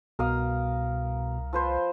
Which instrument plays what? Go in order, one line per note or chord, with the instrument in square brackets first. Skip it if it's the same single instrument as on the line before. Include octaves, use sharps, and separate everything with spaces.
[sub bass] C2 [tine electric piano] B2 [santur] A#4 F5 D#6
[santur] F3 B4 C5